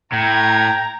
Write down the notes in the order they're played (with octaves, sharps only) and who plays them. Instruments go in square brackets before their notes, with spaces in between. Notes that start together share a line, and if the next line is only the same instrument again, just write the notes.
[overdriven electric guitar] A2 [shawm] G5 [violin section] A#5 [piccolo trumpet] G#6